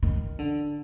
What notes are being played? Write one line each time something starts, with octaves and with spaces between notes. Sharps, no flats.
D#3
D3